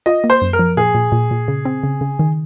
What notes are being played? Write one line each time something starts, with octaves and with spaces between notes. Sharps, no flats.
F4 D#5
A#3
C5
F#2
A#4
F3
A#2 G#4
A#2
A#2
A#2
C#3
C4
C#3
C#3
D#3